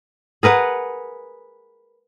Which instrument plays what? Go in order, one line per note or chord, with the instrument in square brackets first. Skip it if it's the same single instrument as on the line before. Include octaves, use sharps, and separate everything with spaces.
[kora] G#4 A#4 B4 F#5